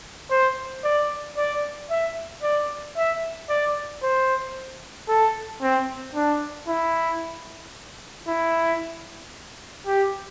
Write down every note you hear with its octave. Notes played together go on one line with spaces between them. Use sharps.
C5
D5
D5
E5
D5
E5
D5
C5
A4
C4
D4
E4
E4
G4